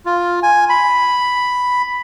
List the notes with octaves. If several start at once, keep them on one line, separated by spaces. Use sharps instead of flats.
F4
G#5
B5